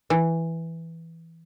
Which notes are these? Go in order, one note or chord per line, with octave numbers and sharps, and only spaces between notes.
E3